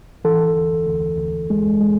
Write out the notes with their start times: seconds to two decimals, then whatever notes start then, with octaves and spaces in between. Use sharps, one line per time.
0.25 E3 A4
0.55 D2
0.87 D2
1.18 D2
1.50 G#3
1.81 G#3